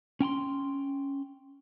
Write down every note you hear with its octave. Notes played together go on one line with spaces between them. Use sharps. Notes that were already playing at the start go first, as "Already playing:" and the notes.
C#4 G5 A#5 C6